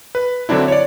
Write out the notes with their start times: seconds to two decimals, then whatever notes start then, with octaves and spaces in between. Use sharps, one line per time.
0.15 B4
0.49 D3 F#3 C4 D4 E4
0.68 C#5 D5